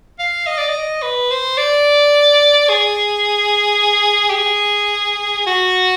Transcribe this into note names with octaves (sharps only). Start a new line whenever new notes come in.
F5
D#5
D5
D#5
B4
C5
D5
G#4
G4
G#4
F#4